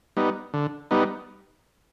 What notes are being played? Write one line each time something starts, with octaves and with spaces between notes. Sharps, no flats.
G3 B3 D#4
D3
G3 B3 D#4